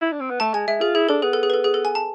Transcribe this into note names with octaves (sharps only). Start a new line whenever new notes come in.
E4
D4
C4
B3
A3 A5
G#3 G#5
G#3 E5
F4 G#4
E4 G#4
D4 A4
B3 G#4
A4
G#4
B4
A4
G#4
A4
G#5
A5